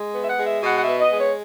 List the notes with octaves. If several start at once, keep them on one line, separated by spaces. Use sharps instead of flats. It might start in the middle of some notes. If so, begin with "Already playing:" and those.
Already playing: G#3
B3
E5
F#5
G#3
E5
B2 F#5
F#5
E5
B3
D#5
G#3
C#5